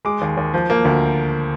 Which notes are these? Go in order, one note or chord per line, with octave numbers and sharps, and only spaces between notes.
G#3 D6
D#2
D#2
F3
A#3
D2